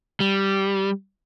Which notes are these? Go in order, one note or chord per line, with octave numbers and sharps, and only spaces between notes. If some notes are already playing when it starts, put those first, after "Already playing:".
G3